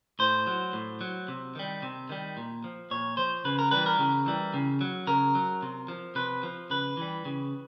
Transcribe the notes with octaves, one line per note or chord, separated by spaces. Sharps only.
A2 C5
F#3
A2
F#3
C3
D#3 G3
C3
D#3 G3
A#2
F3
A#2 C#5
F3 C5
C#3 B4
A#4
E3 G3 B4
A#4
C#3
E3 G3
C#3
F#3
C#3 A#4
F#3
C3
F3
C3 B4
F3
C#3 B4
E3 G3
C#3